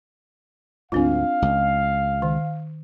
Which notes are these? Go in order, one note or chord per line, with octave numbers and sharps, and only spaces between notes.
D2 G#2 C4 D4 F4 F5
C#2
D#3